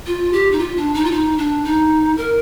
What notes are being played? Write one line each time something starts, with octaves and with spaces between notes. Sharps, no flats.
F4
G4
D#4
F4
D4
D#4
F4
D#4
D4
D#4
A#4